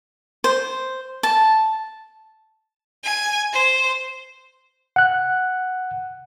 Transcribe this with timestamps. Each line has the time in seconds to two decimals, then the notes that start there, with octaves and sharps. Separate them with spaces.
0.44 C5
1.23 A5
3.04 G#5
3.53 C5
4.96 F#5 F#6